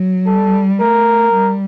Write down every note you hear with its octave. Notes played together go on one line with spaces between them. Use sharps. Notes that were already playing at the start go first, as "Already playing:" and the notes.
Already playing: F#3
G3 A4
A3 A#4
G3